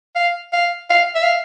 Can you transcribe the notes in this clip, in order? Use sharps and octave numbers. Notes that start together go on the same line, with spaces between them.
F5
F5
F5
E5
F5